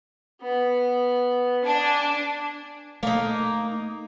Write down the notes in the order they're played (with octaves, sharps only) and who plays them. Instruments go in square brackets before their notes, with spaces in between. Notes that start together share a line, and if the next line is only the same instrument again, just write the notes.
[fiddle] B3
[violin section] D4 [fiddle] G#5
[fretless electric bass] A3 [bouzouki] A#3 D#4